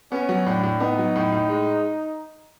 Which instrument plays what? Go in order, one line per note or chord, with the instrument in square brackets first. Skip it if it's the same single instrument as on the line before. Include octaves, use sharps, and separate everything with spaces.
[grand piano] B3 [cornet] C#4
[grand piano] F#3
[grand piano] A2 [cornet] D4
[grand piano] A2
[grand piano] B3 [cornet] D#4
[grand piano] F#3
A2
A2
G#3